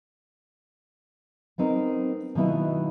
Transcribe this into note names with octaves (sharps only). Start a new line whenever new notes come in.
B3 C4 D#4 A#4
B2 D#3 F#3 B3 E4 F4